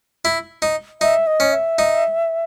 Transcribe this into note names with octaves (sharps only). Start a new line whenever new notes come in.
E4
D#4
D#4 E5
D#5
C#4
E5
D#4